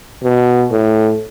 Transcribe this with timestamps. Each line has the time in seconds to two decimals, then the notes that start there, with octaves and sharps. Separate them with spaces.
0.23 B2
0.71 A2